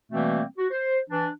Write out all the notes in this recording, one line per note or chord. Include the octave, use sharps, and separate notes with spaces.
B2 E3 G3 A3 A#3 C4
F#4
C5
E3 D4